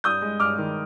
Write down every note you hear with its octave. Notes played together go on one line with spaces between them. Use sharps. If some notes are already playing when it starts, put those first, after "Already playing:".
G2 D#6 G6
G#3
G2 D6 F6
D#3